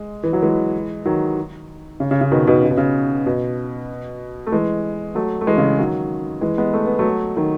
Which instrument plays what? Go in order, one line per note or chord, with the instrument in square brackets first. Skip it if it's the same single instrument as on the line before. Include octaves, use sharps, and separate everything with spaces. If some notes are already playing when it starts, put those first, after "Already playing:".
Already playing: [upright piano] G#3
E3
F#3
E3 G#3
D#3 F#3
C#3
C#3
C#3
B2 D#3
B2 D#3
C#3
B2
C#3
B2
A3
E3 G#3
F#3 A3
A3
E3 G#3
C#3 E3
D#3 F#3
E3 G#3
G#3 B3
A3
B3
F#3 A3
D#3 F#3